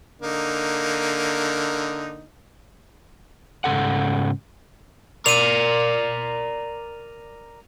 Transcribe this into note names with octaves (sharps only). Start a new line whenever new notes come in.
D3 A#3 D#4
G#2 C#3 A4 F#5
A#4 D5 D#7 F7